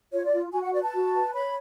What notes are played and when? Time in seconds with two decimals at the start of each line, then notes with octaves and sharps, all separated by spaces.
0.11 F4 C#5
0.25 D5
0.32 F4
0.52 F#4 G#5
0.63 F#5
0.72 B4 D5
0.83 A5
0.94 F#4
1.14 B4
1.34 C#5 B5